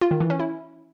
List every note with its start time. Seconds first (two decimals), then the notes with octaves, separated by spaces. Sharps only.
0.01 F4
0.11 D#3
0.20 E3
0.30 C#4
0.39 E4